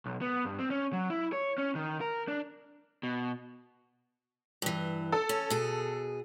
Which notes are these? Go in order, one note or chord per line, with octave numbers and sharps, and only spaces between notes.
B1
B3
G2
C4
C#4
F#3
E4
C#5
C#4
D#3
A#4
D4
B2
G2 E3
A4
C#4
B2 G#4